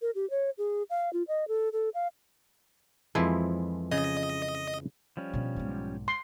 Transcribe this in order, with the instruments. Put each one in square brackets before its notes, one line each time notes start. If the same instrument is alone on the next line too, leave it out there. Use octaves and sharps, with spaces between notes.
[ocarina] A#4
G4
C#5
G#4
F5
F4
D#5
A4
A4
F5
[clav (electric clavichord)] F2 E3 G#3 [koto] F3 E4
[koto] C#3 [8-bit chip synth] D#5
[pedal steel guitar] F3 G3 C#4
[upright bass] B2 D4
B1 G#2
[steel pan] C6